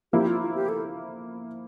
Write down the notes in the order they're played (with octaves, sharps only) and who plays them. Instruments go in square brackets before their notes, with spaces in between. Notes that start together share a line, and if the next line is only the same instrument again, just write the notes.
[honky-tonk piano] F3 A#3 E4 [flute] G4
[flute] F4
F4
G4
A4